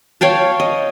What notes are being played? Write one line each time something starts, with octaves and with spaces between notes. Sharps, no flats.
C#5 F5 G5 A5
D#5